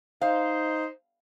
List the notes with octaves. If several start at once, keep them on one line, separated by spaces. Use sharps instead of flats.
D#4 C5 F5